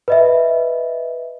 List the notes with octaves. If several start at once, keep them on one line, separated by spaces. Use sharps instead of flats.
B4 D#5 E5